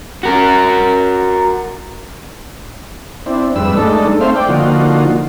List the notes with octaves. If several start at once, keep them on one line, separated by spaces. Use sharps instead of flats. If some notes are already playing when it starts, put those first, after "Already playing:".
F#4 A#4
C4 D4 E4
F2 G#2 G3 B4 E6
G#3 A3 D4 D#4 A4
A3 C4 C5 E5 F5
D5 G5
D3 F3 A#3 D#4 F4 F#4